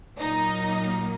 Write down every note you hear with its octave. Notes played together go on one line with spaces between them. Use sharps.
A#2 F#3 A#3 D#4 D#5